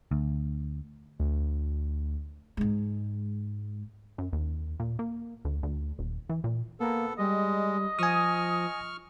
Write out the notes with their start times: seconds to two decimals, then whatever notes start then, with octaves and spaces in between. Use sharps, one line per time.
0.11 D2
1.20 D2
2.57 G#2 G#3
4.18 F#2
4.33 D#2
4.80 A#2
4.99 A#3
5.45 D2
5.63 D2
5.99 D#1
6.29 E3
6.44 A#2
6.80 A#3 B3 A4
7.18 G3 G#3 D#5
7.99 F3 G#5 C#6 D#6 F6